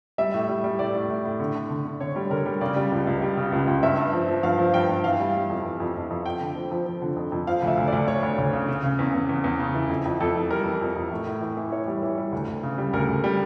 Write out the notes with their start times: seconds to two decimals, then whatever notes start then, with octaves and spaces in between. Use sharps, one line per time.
0.18 G3 E5
0.34 A2
0.49 G3
0.64 G3
0.79 A2 D5
0.95 A2
1.10 A2
1.25 A2
1.40 D3
1.55 D3
1.70 D3
1.85 D3
2.00 D3 C#5
2.16 G3
2.31 D3 A#4
2.46 G3
2.61 C#3 D5
2.76 G3
2.92 C#2
3.07 C#2
3.22 G3
3.37 C#3
3.52 C#2
3.67 C#2
3.83 G2 E5
3.98 G2
4.13 F3
4.28 F3
4.43 G2 F5
4.58 F3
4.74 G2 G5
4.89 G2
5.04 E3 F5
5.19 G3
5.34 G3
5.49 F2
5.65 E3
5.80 F2
5.95 F2
6.10 F2
6.25 F2 G5
6.41 D3
6.56 F3
6.71 F3
6.86 F3
7.02 D3
7.16 F2
7.32 F2
7.47 F3 F5
7.62 D2
7.67 E5
7.77 D2
7.87 D5
7.93 D2
8.08 D2 C#5
8.23 D2
8.38 D2
8.53 C#3
8.69 C#3
8.83 C#3
8.99 E2
9.14 E2
9.29 E2
9.44 E2
9.59 C#3
9.74 E3
9.90 F2
10.05 F2
10.20 F2 A4
10.35 E3
10.51 G3 A#4
10.66 E3
10.81 F2
10.96 F2
11.11 A2
11.27 A2
11.42 E3
11.57 E3
11.72 E3 C#5
11.87 G3
12.02 E3
12.18 G3
12.32 D2
12.48 D2
12.63 C#3
12.78 G3
12.93 D2 A#4
13.08 D2
13.24 G3